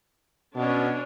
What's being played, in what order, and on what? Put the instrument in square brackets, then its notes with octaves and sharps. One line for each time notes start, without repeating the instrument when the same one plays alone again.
[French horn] B2 [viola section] C#4 D4